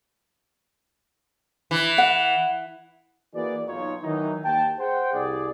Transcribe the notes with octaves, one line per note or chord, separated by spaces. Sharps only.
E3
F#5
E3 A#3 F#4 G#4 B4 D5
B1 D#4 F4 C#5
D#3 E3 F#3 D#4
D#2 G5 A5
G#4 C5 F#5 G5
C2 G#4 D5